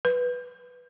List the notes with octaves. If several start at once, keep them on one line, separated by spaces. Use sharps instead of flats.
B4